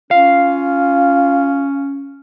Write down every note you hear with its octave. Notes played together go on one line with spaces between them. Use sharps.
C#4 F4 F5